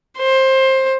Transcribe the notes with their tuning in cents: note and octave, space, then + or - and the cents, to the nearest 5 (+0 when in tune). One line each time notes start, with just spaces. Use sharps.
C5 +20